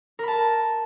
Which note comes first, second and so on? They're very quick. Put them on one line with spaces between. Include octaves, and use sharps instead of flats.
A#4 B5 A5